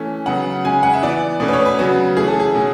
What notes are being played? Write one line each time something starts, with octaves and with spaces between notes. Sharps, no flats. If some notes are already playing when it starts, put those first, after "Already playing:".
Already playing: E3 A3 C#4
C#3 F#3 B3 F#5
C#3 G#3 C#4 G#5
F#5
E5
E3 B3 D5
B2 A3 C#4 D5
B4
C#5
B4
C#3 F#3 B3 F#4
E3 A3 C#4 G#4
A4
G#4
B2 A3 C#4